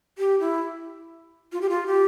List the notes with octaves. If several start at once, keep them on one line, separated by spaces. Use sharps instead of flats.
G4
E4
F4
G4
F4
G4